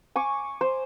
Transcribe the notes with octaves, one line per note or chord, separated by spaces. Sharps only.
G#5 C#6 D6
C5